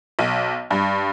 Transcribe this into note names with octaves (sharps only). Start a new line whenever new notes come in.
B1
G2